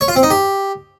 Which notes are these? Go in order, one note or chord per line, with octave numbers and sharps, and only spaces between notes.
C#5
F4
C4
D#4
G4